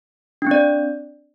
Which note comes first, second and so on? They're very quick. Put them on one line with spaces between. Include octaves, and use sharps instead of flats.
D4 C4 D5